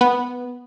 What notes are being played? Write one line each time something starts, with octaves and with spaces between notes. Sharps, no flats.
B3